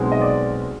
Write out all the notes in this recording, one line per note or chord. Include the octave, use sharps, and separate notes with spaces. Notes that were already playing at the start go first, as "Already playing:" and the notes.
Already playing: B1 B2 G#3 C4
D#5
D5